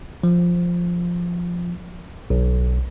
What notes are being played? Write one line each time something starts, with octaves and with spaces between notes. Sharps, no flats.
F3
B1